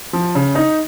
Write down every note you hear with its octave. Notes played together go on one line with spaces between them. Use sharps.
F3
C#3
D#4